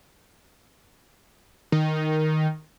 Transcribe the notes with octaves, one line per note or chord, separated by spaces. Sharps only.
D#3